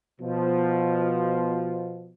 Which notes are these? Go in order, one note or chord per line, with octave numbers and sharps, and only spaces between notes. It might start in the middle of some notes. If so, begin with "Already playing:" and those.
B2 F3